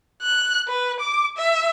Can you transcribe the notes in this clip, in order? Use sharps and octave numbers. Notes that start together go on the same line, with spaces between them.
F#6
B4
D6
E5